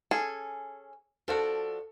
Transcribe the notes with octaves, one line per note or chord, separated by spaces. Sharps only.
C#4 G#4 A4
F3 D4 F#4 A4